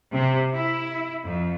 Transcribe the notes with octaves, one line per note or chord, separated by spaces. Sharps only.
C3
E4
F2